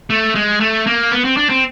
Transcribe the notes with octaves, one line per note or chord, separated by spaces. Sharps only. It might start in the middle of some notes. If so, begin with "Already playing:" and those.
A3
G#3
A3
A#3
B3
C4
D4
C4